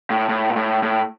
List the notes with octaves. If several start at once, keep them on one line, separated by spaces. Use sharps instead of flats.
A2
A2
A#2
A2
A2